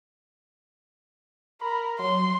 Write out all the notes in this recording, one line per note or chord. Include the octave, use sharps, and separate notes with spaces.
A#4 B5
F#3 C6